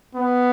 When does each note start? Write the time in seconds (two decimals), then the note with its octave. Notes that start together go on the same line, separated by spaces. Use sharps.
0.15 B3